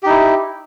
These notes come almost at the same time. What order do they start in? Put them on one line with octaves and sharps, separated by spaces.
G4 D#4 E4